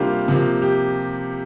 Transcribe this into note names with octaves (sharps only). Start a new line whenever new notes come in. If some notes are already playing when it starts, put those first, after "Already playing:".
Already playing: C3 G3 A#3 D4 F4 G4
C3 F3 A#3
G4